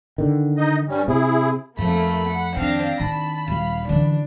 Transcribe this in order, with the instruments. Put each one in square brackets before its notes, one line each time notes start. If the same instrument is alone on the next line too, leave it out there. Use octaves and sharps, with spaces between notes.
[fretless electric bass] D3 D#3
[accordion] D#4 D#5
G2 G3 C#4
[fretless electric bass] C3 [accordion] E4 G#4
[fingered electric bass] F2 F3 [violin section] A3 A#3 [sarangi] B5
[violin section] F#5
[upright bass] D#3 [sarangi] C4 [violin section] D4 F5 A#6
[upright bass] D#3 [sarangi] A5 [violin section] B5
[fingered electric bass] D#1 G3 [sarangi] F5
[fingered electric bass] D3 E3 [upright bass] F#3 C#4 [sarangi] D4